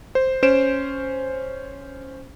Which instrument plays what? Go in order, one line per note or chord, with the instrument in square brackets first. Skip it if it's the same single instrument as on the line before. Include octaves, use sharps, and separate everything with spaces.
[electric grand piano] C5
C#4 C5 D7 E7